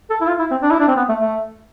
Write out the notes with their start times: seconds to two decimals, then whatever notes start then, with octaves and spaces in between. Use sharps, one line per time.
0.10 A4
0.21 E4
0.27 F4
0.39 E4
0.51 C4
0.62 D4
0.71 E4
0.80 D4
0.88 C4
0.96 B3
1.09 A3
1.20 A3